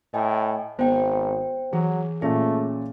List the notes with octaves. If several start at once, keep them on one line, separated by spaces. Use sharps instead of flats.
A2 D#5 G5 G#5
G#1 B3 C5 G5
E3 F#3 G#4
A#2 A3 C#4 G#4